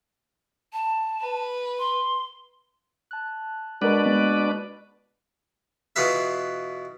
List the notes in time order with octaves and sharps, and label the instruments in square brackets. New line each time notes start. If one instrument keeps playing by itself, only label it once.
[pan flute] A5
[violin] B4
[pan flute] C6
[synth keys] A5 F#6
[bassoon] B2 [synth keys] G#3 A#4 B5 [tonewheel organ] D4 B4 D5
[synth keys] G#3 A#3 B3
[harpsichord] B2 E3 F4 G#4 B4 E5